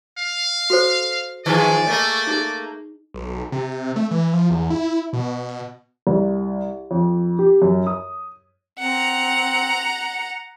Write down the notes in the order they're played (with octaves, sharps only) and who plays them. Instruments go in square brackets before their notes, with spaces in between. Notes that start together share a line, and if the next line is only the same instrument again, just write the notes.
[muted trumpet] F5
[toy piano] F#4 A4 C5
[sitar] D#3 F3 G#4 [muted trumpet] D5
[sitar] A3 A#3 [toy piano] D#5
[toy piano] D#4 G#4
[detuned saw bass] B1
C3
A3
E3
F3
E2
E4
B2
[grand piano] C2
F2
G4
F#2
D#6
[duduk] C4 [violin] F#5 A#5